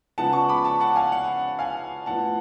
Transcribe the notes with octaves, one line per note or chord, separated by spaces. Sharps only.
C#3 F3 G#3 B3 F#5 A5
A5 C#6
B5 D6
A5 C#6
F#5 A5
F5 G#5
F#5
F5 G#5
A2 F3 B3 F#5 A5